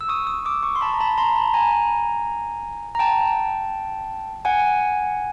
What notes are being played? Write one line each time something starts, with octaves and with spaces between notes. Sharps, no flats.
E6
C#6 D#6
C#6 D#6
D6 E6
C#6 D#6
C6
A5 B5
A#5
A5 B5
A#5 C6
A5 B5
G#5 A#5
A#5
G5 A5
F#5 G#5